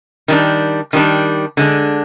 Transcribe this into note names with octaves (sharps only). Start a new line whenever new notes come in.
D#3 G3 D4
D#3 G3 D4
D3 G#3 D4